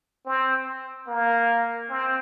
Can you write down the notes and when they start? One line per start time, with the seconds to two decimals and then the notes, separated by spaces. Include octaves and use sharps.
0.26 C4
1.08 A#3
1.90 C4